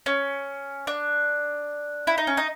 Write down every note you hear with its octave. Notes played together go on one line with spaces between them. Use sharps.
C#4
D4
E4
D#4
C#4
D#4